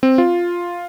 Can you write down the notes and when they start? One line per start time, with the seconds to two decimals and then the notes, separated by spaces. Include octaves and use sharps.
0.03 C4
0.18 F4